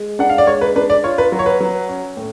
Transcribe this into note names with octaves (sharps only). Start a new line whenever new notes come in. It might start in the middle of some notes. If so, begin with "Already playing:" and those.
Already playing: G#3
D4 F#5
F5
D5
G#3 C#5
B4
D4 B4
D5
F4 C#5
B4
F#3
C#5
B4
F#3
C#4
A2